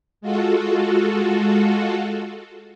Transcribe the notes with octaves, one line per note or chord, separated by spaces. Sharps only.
G#3 F4 F#4 A4